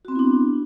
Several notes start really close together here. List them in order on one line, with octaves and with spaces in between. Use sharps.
F#4 C4 B3 E4 D4